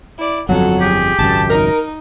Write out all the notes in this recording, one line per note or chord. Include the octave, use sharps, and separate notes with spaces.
E4 D5
G1 F2 F#3 A4 F#5
G4 G#4
G#1 C#2 F#2 A5
D#4 A#4